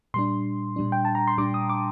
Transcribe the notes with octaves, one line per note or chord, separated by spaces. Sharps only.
A#2 G3 D4 C6
A#2 G3 D4
G5
A5
A#5
C6
A#2 G3 D4 D6
D#6
D6